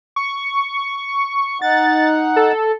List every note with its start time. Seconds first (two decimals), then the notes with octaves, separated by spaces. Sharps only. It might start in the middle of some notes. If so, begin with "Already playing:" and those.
0.16 C#6
1.62 D#4 F#5 A6
2.36 A4